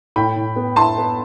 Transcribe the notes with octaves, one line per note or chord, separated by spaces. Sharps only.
A2 G5 B5
A2
B3
E4 A5 C6
B3